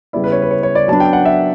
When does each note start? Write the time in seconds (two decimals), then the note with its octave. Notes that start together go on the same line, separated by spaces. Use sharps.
0.13 C#3 G3 B3 E4 D5
0.24 B4
0.32 C#5
0.42 B4
0.51 C#5
0.63 C#5
0.75 D5
0.88 F#3 B3 D4 A5
1.00 G5
1.13 F#5
1.25 E5